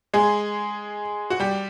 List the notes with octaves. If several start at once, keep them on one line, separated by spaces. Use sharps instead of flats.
G#3 G#4
F#4
G3 G4